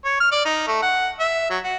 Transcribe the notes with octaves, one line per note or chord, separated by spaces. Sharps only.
C#5
F6
D5
D#4
A3
F#5
E5
F#3
F#4